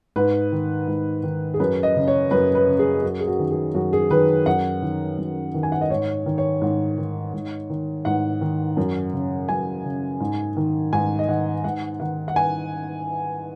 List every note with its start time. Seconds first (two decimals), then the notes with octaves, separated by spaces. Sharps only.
0.16 G#2 B4
0.52 D#3
0.88 G#2
1.23 D#3
1.54 G#4
1.60 F#2 B4
1.83 D#5
1.96 C#3
2.08 C#5
2.31 F#2 B4
2.55 B4
2.67 C#3
2.79 G#4
3.03 F#2 F#4
3.21 G#4
3.28 F#4
3.39 D#3
3.51 G#4
3.75 F#2 F#4
3.93 G#4
4.10 D#3 B4
4.46 F#2 F#5
4.82 D#3
5.18 F#2
5.54 D#3
5.63 G#5
5.72 F#5
5.81 D#5
5.90 G#2 C#5
6.26 D#3
6.38 C#5
6.62 G#2
6.98 D#3
7.34 G#2
7.70 D#3
8.05 G#2 F#5
8.41 D#3
8.77 F#2
9.13 C#3
9.49 F#2 G#5
9.84 C#3
10.20 G#2
10.57 D#3
10.93 G#2 G#5
11.19 D#5
11.28 D#3 F#5
11.64 G#2 F#5
12.00 D#3 F#5
12.28 F#5
12.36 G#5